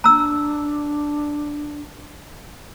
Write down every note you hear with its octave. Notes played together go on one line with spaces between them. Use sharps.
D4 A#5 E6